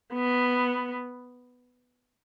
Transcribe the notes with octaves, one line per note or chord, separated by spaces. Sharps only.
B3